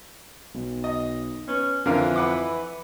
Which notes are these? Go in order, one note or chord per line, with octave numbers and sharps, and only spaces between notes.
B1
D#5
B3 C#4
F2 D3 E3 A#4 F5
B4 F#5 D6